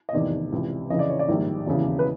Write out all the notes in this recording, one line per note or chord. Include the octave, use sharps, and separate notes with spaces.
D#5
F1 E2 C3 D#3 D5
C#2 C3 E3
F2 C#3 E3 D#5
D5
C#5
D5
A#1 G#2 D#3 G3
E1 D#2 C#3 E3
B4